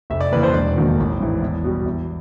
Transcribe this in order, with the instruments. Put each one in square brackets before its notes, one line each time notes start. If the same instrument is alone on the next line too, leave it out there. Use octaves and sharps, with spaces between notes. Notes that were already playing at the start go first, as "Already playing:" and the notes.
[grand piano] F1 E5
D5
D#2 C#3 E3 B4
C5
E1 D5
D#2 D#3 F#3
A1
G#2 E3
E2
B2 G3
E2